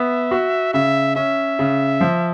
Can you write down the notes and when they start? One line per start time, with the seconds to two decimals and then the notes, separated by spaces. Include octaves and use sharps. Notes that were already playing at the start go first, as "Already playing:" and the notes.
Already playing: B3 E5
0.31 F#4
0.74 C#3 E5
1.16 C#4 E5
1.59 C#3
2.01 F3